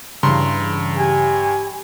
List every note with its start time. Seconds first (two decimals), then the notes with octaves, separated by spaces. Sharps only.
0.23 G2 C#3 E3 A#5 C6
0.97 G4 G#5